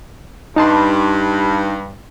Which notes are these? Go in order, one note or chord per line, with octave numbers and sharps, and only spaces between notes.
G2 D#4 A5 C6